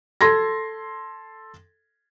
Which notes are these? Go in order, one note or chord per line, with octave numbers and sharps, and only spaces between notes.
A4 C6 G#6 A#6